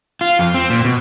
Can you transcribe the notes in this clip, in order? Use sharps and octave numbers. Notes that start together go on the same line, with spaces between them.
F4
F2
C4
A#2
B2